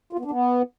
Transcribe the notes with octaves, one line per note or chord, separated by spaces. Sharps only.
F4
B3
D4
B3